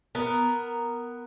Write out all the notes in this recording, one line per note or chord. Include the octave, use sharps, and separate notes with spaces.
B3 A#4